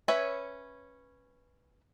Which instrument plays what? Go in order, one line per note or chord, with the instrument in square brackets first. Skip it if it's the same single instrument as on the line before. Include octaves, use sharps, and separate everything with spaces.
[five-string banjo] C#4 B4 C#5 E5 G#5